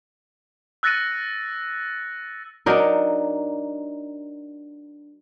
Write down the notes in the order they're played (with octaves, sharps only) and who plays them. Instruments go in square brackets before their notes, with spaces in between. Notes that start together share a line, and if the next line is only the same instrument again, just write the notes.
[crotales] E6 F#6 A6 A#6 C#7 D#7
[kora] F#3 D4 D#4 A#4